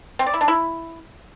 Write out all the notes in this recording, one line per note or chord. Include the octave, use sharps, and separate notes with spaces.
C4
D5
E4
D4
E4